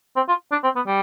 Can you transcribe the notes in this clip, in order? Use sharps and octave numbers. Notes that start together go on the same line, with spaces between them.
C4
F4
D4
C4
B3
G3